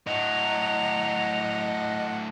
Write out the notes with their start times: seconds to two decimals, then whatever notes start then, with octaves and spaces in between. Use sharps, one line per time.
0.07 A2 F#3 D#5 F#5 F7